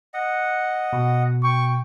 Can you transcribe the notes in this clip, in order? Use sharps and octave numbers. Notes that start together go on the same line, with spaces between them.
D#5 F#5
B2
G5 C#6